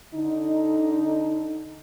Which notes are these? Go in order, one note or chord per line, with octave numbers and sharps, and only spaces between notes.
D3 D#4